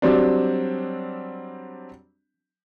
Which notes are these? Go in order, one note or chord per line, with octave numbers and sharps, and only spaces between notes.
F#3 G3 C4 D4